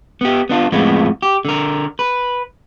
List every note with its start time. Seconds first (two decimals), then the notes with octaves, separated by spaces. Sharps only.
0.21 B3 G4
0.49 B3 D4 F4
0.72 F2 A2 F3 G#3 B3
1.22 G4
1.45 D3 A#4
1.99 B4